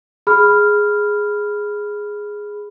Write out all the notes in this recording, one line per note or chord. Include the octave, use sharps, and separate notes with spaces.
G#4 B5 F6